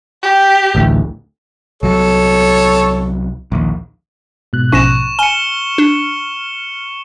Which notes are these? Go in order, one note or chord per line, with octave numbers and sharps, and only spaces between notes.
G4
A1 D2
C2 F#3 A4 C#5
A#1 D#2
G#2 B2 F#6
A#1 C#4 C#6 A#6 E7
G#5 F6 C#7 G7
D4